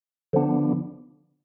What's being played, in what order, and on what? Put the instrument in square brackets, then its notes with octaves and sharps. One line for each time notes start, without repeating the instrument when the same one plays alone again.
[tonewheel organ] D3 F3 B3 D4